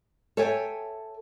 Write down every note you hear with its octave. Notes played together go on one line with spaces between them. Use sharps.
A4 C#5 E5 G5 G#5